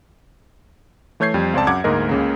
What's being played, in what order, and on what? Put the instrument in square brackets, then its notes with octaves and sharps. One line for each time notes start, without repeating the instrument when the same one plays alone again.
[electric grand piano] E3 A3 C#5 G6 G#6 C7
F2 G3
C#2 C4 C5 D5 A5
F#2 F#5 D6 G#6
D2 G#2 A#3 A#4 D#5
C#2 C#3 A#3